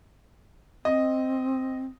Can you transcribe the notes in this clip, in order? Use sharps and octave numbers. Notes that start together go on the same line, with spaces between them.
C4 D#5